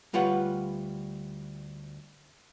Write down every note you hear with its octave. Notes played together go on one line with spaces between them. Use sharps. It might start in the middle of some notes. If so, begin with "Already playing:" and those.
D2 G3 F4 B4 C#5 F#5